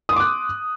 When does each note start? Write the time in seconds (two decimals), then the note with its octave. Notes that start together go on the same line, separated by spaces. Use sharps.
0.09 D#6
0.13 C6
0.16 D6
0.20 F#6